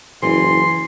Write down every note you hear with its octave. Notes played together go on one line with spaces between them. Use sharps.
F#1 E3 C6